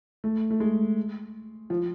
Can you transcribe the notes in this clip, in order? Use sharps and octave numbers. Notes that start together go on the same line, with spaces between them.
A3
A3
G#3
F3